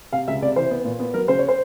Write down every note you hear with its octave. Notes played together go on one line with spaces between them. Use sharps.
C3 F5
C#2 E5
C3 D5
E3 C5
B3
A#2
B3
F#3 A#4
C#3 C5
C#5
C5